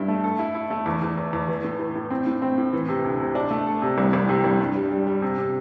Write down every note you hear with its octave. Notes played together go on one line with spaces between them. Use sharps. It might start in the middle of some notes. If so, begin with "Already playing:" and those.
Already playing: G2 E4
A3
A4
E4
E4
A3
E2
E2
E2
E2
E3
A2
E3
A2
C4
A2
C4
A2
E3
C3
D2
C3
D4
A3
A4
C3
C2
C2
C3
C2
G2
G3
G3
G3
C3
C3